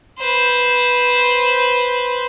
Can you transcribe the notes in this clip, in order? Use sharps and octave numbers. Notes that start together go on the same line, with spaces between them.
B4 C5